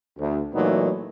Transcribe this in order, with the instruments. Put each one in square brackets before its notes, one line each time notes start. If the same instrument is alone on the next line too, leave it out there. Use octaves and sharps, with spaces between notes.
[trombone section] D2
A#2 E3 F#3 A3 B3 D#4